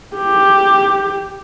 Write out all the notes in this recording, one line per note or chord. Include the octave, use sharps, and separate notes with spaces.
G4